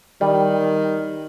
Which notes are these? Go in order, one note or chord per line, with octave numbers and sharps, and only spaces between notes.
D#3 G3